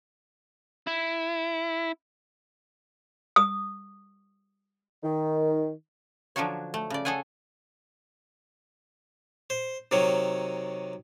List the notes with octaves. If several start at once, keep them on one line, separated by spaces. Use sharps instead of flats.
E4
D#6
D#3
D3 F3 F#3 D4 F#4 C#5
A3
C#3 D5
G#4 A4 C#5 F#5 G#5
C5
C3 D#3 F#3 C#5